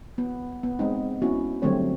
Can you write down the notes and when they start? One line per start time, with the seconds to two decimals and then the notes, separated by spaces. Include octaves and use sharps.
0.18 B3
0.63 B3
0.79 G#3 C4 D#4
1.22 B3 C#4 E4 F#4
1.62 D3 F#3 G3 A3 C4 C#5